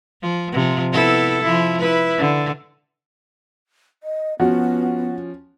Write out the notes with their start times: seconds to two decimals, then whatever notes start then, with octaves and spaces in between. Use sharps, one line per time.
0.22 F3
0.52 C3 F3
0.92 B3 E4 A4
1.42 F3 E4
1.79 E4 B4
2.17 D3
4.03 D#5
4.40 F3 B3 C#4 F#4